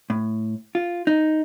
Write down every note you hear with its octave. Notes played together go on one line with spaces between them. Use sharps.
A2
F4
D#4